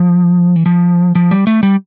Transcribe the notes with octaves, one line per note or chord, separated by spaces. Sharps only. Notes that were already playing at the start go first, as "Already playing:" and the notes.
Already playing: F3
E3
F3
F3
G3
A3
G3